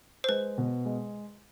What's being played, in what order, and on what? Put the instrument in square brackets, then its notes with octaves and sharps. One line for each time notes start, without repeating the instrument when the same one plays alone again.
[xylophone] C5
[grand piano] G#3 [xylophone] B4
[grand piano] B2
G#3